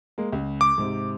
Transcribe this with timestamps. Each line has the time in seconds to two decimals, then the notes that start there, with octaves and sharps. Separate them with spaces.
0.18 G#3 A#3
0.32 C#2
0.61 D6
0.78 G#2 C3